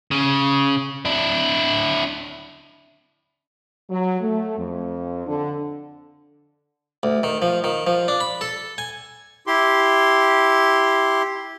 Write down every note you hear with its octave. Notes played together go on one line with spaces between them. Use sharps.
C#3
D4 E4
F#3
A3
F2
D3
D2
D#3
F3
D#3
F3
D4
B5
A4
G#5
E4 G4 C6